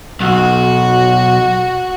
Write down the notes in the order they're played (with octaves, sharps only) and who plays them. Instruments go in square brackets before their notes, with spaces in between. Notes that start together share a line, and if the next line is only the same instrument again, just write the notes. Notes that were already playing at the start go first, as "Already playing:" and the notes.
[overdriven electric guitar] B1 [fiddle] F#4